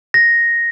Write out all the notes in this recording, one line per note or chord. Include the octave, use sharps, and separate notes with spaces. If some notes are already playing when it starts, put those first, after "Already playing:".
A#6